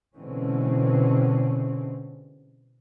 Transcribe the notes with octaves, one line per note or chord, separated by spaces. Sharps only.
B2 D3 E3 G#3 C4 C#4